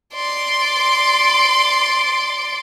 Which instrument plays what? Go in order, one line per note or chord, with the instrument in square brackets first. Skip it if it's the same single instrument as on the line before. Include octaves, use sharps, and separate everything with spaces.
[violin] D5 C6